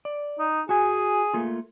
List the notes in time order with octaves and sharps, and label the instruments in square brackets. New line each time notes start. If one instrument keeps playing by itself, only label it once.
[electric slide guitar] D5
[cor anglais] D#4
[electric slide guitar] F#4 G#5 [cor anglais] G#4
[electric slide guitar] A3 A#3 F4